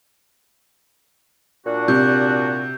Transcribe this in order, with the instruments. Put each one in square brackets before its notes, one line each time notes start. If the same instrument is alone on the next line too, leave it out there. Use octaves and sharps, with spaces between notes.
[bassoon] A#2 [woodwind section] D4 F#4
[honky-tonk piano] C3 [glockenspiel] G6